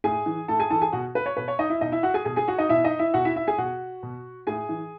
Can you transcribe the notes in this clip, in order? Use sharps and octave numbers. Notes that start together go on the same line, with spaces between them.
A2 G#4 G#5
E3
A2 A4 A5
G#4 G#5
E3 A4 A5
G#4 G#5
B2 F#4 F#5
B4
C#5
B2 B4
C#5
D#4 D#5
E4 E5
B2 D#4 D#5
E4 E5
F#4 F#5
G#4 G#5
B2 G#4 G#5
G#4 G#5
F#4 F#5
D#4 D#5
B2 E4 E5
D#4 D#5
E4 E5
B2 F#4 F#5
E4 E5
E4 E5
G#4 G#5
B2 F#4 F#5
B2
A2 G#4 G#5
E3